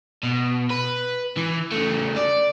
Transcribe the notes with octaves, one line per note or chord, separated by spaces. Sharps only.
B2
B4
E3
C#3 A3
D5